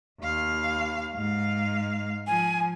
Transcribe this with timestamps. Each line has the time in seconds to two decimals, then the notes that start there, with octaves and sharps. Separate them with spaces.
0.21 D#2 F5
1.13 G#2 F5
2.27 F3 G#5